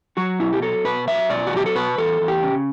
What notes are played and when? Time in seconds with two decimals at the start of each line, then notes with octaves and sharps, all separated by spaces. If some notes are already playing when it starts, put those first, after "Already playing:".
0.17 F#3 F#4
0.39 B2 E4
0.53 G4
0.62 F#3 A4
0.85 B2 B4
1.07 F#3 E5
1.30 B2 D5
1.47 F#4
1.53 F#3 G4
1.66 A4
1.75 B2 B4
1.98 E2 A4
2.21 E2
2.28 G4
2.43 C#3